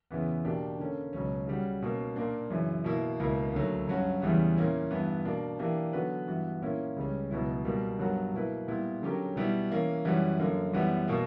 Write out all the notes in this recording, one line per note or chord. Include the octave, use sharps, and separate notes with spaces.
E2 C#3 E3 B3
B2 A#3 D4 G4
D3 A#3 C#4
C#2 B2 F#3 C#4
C#3 G3 C#4 F#4
B2 A#3 C#4
A#2 A#3 D4
F#2 C#3 E3
B2 A#3 E4
C#2 B2 A#3 E4
D2 D3 F#3 A#3
G2 F#3 C#4 F#4
E2 C#3 E3 G3 B3
A#2 A#3 C#4 E4
G2 E3 B3
B2 A#3 D4
E3 A#3 D4 G4
D3 F#3 B3 F#4 B4
G2 E3 B3 F#4
A#2 A#3 C#4 E4
C#2 C#3 G3 C#4
C#2 B2 F#3 B3 E4
B2 G3 A#3
G2 F#3 B3 F#4 A#4
B2 A#3 E4 B4
A#2 G3 B3 E4
D3 F#3 C#4 G4 A#4
B2 G3 B3 E4
E3 A#3 C#4
F#2 E3 G3 C#4 F#4
F#2 D3 A#3
F#2 E3 G3 B3 F#4
B2 A#3